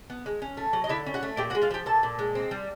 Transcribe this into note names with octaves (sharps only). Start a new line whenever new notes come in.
B3
G#3
C#4
A3
F#3
D#5
D3 E4 E5
C#4
F#4 F#5
A3
A#2 G4 G5
F#4 F#5
G#3
F4 F5
F3 G4 G5
A#2 A4 A5
A#2
G#3
C4
G3